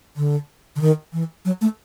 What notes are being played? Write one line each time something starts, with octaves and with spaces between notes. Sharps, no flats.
D3
D3
D#3
E3
F#3
A3